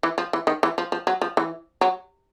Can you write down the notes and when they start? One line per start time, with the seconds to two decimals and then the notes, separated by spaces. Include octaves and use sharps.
0.03 E3
0.18 F3
0.33 E3
0.47 D#3
0.63 E3
0.78 F3
0.92 F3
1.07 F#3
1.22 F3
1.37 E3
1.81 F#3